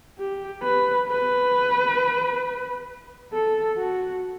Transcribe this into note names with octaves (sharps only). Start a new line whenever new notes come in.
G4
B4
B4
A4
F#4